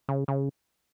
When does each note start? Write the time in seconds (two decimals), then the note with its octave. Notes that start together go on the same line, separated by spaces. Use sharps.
0.09 C#3
0.28 C#3